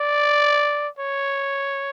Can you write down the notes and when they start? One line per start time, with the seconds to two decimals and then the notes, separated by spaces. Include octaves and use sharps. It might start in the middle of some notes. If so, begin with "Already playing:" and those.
Already playing: D5
0.99 C#5